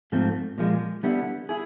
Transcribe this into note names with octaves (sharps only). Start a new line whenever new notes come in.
G#2 F3 A3 C4
A#2 F3 G#3
D3 G3 B3 E4
E4 G#4